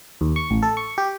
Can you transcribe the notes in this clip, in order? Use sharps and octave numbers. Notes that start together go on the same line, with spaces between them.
D#2
C#6
A1
A4
C#6
G4